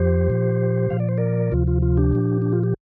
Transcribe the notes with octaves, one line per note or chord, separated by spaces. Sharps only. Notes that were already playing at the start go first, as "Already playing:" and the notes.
Already playing: F2 F3 G4 C5
A#2 F3
A#2 F3 F5
D5
C5
A#4 D5
D2 C3 F3 F4
F4
F4
D4 G4
A#2 F3
D4
F4
G4